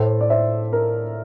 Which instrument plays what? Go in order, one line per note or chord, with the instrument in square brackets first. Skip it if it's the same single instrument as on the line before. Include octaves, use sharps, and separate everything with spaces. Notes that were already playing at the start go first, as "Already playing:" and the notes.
Already playing: [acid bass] A2 [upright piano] A4 C5
[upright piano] D5
C5 E5
A#4